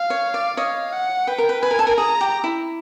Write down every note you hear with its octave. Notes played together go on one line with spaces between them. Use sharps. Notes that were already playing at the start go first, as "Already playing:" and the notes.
Already playing: F5
C#5
D5
C#5 D#5 F5
F#5
B4 G5
A#4
B4
B4 G#5
A#4
A4
A#4
G#4 A#5
G4
E4